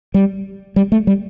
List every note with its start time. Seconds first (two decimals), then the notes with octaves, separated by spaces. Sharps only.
0.14 G3
0.76 G3
0.92 A3
1.07 G3